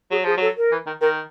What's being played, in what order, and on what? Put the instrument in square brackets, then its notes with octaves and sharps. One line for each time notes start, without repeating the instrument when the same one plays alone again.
[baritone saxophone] F#3 [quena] G#4
[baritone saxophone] F3 [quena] G#4
[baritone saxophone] F#3 [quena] A4
[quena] A#4
[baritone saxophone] E3
D#3
[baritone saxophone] D#3 [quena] A#4